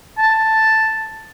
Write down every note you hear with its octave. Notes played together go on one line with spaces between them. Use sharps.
A5